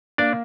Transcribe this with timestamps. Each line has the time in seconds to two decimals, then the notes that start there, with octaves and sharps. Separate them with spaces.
0.18 A#3 D4 D5